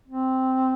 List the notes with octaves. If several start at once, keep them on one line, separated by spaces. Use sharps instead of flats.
C4